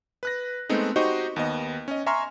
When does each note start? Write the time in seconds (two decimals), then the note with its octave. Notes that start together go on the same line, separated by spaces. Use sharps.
0.23 B4 F#6 A#6
0.69 G#3 A3 B3 C4 D#4
0.96 D#4 F#4 G4 C5 D#5 C#6
1.36 D#2 B3 D#5
1.88 C#4 D#5
2.06 E5 G#5 A#5 C6 C#6 F6